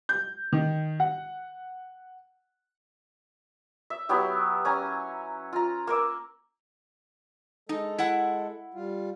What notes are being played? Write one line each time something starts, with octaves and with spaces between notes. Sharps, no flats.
G6
D#3
F#5
E5
F#3 B3 E4 G4
C#4 G#5 A#5
F4 A#5
A#3 A#4 D6 E6
G#3 D#4 A4
E4 F#5
G3 F4